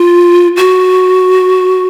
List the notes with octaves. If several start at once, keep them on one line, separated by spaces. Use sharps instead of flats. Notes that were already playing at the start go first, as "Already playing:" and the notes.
Already playing: F4
F#4